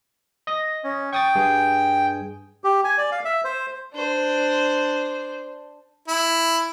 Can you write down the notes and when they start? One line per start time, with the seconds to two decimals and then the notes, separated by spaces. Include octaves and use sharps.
0.47 D#5 D#6 A#6
0.84 C#4
1.13 G5 C#6 D#6 A6
1.35 G2 G#4 G#5
2.64 G4
2.84 G#5
2.98 D5
3.12 F5
3.25 E5
3.45 C5
3.94 D4 C5
6.08 E4